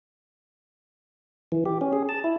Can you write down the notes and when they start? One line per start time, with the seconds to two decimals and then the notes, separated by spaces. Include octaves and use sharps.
1.52 E3
1.66 G4
1.81 C#4
1.93 G#4
2.09 A5
2.24 E4